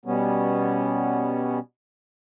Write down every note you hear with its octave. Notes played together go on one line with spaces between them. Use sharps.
B2 G3 B3 C#4